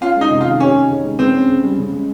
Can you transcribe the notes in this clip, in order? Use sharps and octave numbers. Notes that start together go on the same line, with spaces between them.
C#4 F4
G#3 D#4
C3
F4
D#3
C#4 G4
D#4
C#3
G#3
C#3 C4
C#4
C#3
G3
C#3
G#3